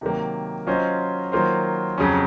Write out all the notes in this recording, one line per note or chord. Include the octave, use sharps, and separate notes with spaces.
C3 D#3 F#3 A#3
F#3 C#4 F4 C5 D#5
D#3 F#3 A#3 F4 C5
F2 C#3 F#3 C#4